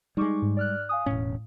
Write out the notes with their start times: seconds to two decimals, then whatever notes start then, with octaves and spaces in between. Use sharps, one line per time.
0.17 G3 G#3 D#4 C#6 D6
0.42 G#2
0.57 D5 F6 F#6
0.89 F5 G#5 D#6
1.06 E1 A2 C#4